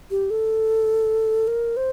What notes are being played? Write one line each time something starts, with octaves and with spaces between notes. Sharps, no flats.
G4
A4
A#4
C5